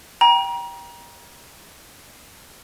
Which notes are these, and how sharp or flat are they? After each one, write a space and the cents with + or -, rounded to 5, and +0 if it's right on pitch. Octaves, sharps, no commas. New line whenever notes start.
G5 +0 A#5 +30